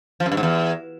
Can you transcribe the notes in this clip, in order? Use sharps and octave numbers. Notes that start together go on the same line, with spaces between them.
F3
F#2
G2
G#2
E2